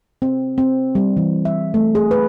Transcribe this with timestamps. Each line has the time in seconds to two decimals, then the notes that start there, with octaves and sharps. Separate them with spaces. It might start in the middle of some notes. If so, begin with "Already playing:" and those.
0.22 C4
0.58 C4
0.95 G3
1.17 E3
1.45 E5
1.74 A3
1.95 G#4
2.11 B4